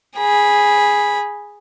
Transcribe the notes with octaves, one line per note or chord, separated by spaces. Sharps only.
G#4 B5